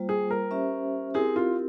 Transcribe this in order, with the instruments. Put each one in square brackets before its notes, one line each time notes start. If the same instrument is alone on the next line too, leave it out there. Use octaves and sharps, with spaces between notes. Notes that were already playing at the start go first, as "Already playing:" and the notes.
Already playing: [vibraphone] G3 A#3 F4 C5
[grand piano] G#4
A#4
[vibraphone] C#4 G4 C5 E5
[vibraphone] C4 E4 G4 A#4 [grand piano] G#4
[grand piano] F4